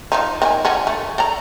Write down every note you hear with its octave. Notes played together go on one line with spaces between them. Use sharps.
D#3 F3 D#4
D#3 E4 G#5
D3 F3 C#4
A3
A4 D5 A#5